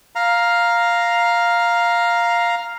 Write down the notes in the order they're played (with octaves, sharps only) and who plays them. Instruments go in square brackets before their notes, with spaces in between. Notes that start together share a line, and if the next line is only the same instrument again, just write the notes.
[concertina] F5 A#5